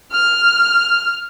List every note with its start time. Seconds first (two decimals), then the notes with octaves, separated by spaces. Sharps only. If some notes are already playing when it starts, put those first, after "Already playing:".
0.11 F6